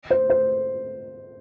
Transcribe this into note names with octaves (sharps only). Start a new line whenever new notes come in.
C5
C5